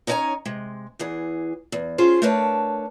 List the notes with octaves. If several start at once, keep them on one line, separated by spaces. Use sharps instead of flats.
C#4 D#4 E4 C#5 G#5 A#5
C3 G#3
E2 E3 G#4
E2
C#4 F4 G#4 C5
A3 D4 A#4 B4 C#5 A5